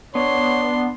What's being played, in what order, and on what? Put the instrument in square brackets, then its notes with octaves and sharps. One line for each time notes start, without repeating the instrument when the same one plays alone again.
[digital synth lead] B3 [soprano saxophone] D4 [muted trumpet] C#5 [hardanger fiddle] C6